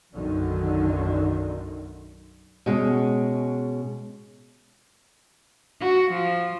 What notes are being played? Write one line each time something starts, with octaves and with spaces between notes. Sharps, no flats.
B1 F#2 D3 D#3 F#3
B2 G#3 C#4
F#4
F3